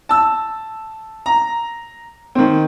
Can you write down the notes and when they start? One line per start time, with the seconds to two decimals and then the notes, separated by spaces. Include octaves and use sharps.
0.09 A5 E6
1.26 A#5
2.35 D#3 C4